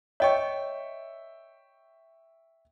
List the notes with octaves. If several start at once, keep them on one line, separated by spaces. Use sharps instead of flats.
C#5 D#5 E5 G5 C#6